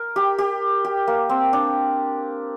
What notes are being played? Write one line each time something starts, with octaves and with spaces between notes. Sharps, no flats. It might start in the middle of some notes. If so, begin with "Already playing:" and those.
Already playing: A#4
G4
G4
G4
A#3
C4
D4